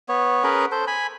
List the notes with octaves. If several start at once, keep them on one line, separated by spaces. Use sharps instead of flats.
B3 C#5
C#4 G#4 A#4 B4
A4 C5
G#5 B5